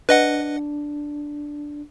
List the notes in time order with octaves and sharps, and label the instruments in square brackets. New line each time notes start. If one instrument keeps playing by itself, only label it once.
[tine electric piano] D4 [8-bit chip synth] B4 D#5 F#5